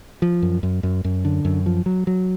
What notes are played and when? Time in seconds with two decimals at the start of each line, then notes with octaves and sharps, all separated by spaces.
0.22 F3
0.42 F#2
0.63 F#2
0.83 F#2
1.04 F#2
1.25 D3
1.45 F#2
1.66 F3
1.86 F#3
2.07 F#3